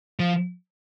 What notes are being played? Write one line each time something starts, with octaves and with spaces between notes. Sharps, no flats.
F3